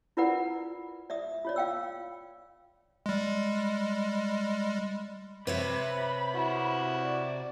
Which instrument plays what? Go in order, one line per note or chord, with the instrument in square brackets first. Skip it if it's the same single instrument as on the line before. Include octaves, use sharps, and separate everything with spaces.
[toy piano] E4 F4 A#4 B4 D5 F#5
D5 E5 D#6
F4 C#5 D5
F5 G5 E6
[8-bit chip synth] G3 G#3
[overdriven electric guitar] C3 [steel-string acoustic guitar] B4 C#5 E5 [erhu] B5
[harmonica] E4 F#4
[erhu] D5